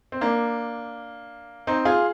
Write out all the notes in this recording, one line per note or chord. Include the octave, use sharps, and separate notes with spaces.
C4
A#3 D4
C4 D#4
F4 G#4